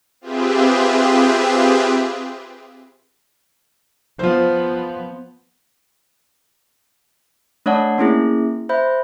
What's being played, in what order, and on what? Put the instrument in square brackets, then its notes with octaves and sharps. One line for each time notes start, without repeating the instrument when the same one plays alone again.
[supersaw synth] C4 F4 G4 G#4 B4 E5
[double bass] F3 B3 [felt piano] F4 C5
[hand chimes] A3 D4 C#5 D5 F#5 A5
A#3 C#4 E4 G#4
C5 E5 B5 G6